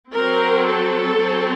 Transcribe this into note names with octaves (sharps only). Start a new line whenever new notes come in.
F#3 C4 A#4
A4
F#3 C4